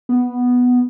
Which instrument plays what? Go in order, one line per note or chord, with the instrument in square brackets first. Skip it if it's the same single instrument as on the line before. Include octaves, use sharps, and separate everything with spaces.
[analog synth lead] B3